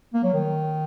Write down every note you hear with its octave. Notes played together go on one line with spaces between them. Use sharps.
A#3
F#3
D#3